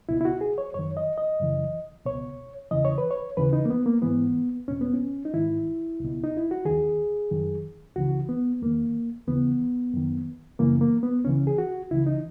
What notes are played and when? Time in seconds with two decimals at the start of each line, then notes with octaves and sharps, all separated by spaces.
0.09 C#2 B2 E4
0.21 E4
0.25 F#4
0.41 G#4
0.58 C#5
0.74 F#2 D#3 C#5
0.97 D#5
1.18 D#5
1.39 F#2 C#3 E3
2.05 C#2 B2 C#5
2.71 E2 C#3 E3 D#5
2.85 C#5
2.98 B4
3.11 C#5
3.37 D#2 C#3 E3 B4
3.53 D#4
3.65 A#3
3.70 B3
3.86 A#3
4.02 G#2 E3 B3
4.68 E2 B2 C#4
4.81 B3
4.94 C#4
5.25 D#4
5.34 G#2 D#3 E4
6.00 C#2 B2
6.24 D#4
6.37 E4
6.51 F#4
6.65 D#2 D#3 G#4
7.31 F#2 D#3
7.96 C#2 C#3 E3 F#4
8.29 B3
8.62 E2 D#3 A#3
9.27 D#2 C#3 E3 B3
9.94 F#2 D#3
10.59 F#2 C#3 E3 A#3
10.81 A#3
11.03 B3
11.25 C#2 C#3 E3 C#4
11.47 G#4
11.58 F#4
11.90 C#2 C#3 E3 E4
12.07 D#4